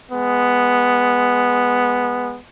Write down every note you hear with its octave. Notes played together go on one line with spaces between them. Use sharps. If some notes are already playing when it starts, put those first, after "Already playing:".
G#3 B3